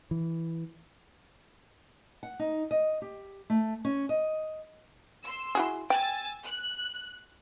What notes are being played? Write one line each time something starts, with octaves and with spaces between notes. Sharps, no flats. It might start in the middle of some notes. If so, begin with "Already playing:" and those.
E3
F#5
D#4
D#5
G4
A3
C#4
D#5
C6 E6
E4 F#4 G#4
G5 G#5 E6 A6
F#6